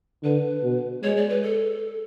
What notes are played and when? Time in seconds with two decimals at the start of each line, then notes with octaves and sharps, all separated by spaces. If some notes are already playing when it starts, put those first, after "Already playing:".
0.23 D3 B4
0.64 B2
1.03 G#3 C#5
1.17 D5
1.29 B4
1.43 A4